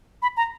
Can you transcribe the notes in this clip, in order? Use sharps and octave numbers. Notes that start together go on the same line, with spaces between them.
B5
A#5